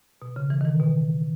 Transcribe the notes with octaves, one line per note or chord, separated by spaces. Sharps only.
B2
C#3
E3
D#3
E3
B2